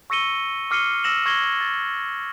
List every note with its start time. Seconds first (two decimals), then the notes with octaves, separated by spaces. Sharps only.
0.10 C#6 E6 A#6 C#7 D#7 G7
0.71 D6 F6 C7 C#7 D#7 G7
1.04 E6 A#6 E7 F#7
1.26 C#6 G#6 A#6 C7 F#7 G7
1.61 A6